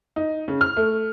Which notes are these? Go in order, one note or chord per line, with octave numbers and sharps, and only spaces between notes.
D#4
C#3
F6
A3